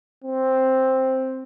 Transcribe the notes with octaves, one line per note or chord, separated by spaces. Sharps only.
C4